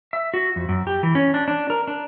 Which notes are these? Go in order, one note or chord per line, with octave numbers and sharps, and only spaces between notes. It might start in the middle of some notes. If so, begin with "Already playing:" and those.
E5
F#4
F2
F#2
G4
E3
C#4
D4
D4
A#4
D4